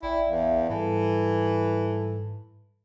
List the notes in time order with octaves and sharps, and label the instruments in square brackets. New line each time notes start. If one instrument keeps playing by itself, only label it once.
[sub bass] A1 [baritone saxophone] E4 [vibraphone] D5 E5 G5
[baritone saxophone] E2 [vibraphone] E5 F5
[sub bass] G#2 [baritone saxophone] E3 [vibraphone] G3 A4 A5